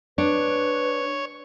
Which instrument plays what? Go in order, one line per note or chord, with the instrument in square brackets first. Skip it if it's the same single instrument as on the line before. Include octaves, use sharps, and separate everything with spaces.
[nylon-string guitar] D4 [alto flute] B4 [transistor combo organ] C#5